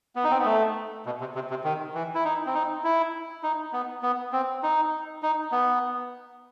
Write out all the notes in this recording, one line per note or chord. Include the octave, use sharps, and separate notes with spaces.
B3
D#4
C4
B3
A3
B2
C3
C3
C3
D#3
E3
E4
D#4
C4
D#4
E4
D#4
B3
B3
C4
D#4
D#4
B3